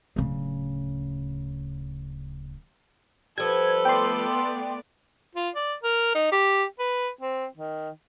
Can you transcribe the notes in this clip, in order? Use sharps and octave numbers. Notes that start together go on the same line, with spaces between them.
D1 C#3
F3 G3 A4 B4 G#6
A3 B3 D5 G5 C6
F4
D5
A#4
D#4
G4
B4
C4
D#3